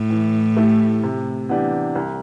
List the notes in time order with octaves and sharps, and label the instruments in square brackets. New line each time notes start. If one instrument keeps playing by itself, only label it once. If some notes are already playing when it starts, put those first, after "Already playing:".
Already playing: [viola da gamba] A2
[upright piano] E3
A3 E4 G4
C3
E3 B3 D4 G4
C2